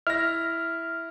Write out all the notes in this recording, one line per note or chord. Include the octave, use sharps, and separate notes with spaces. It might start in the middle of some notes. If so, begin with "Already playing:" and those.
E4 F6 A#6